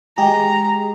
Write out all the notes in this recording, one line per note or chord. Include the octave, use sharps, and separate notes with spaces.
G#3 G4 G#4 A#5